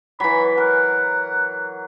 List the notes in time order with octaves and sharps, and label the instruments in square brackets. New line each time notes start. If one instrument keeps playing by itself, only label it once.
[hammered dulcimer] E3 F#3 [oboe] B5
[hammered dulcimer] A#4 [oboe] F#5